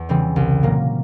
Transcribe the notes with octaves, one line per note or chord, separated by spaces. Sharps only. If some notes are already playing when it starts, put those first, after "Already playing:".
Already playing: E2
C#3 E3 G3 C4
C2
A#2 F#3 A#3